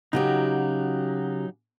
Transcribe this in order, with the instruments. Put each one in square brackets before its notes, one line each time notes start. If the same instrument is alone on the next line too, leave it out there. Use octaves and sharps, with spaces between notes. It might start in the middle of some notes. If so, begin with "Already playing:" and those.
[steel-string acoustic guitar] C#3 F#4 G4 [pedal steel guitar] F#3 D#4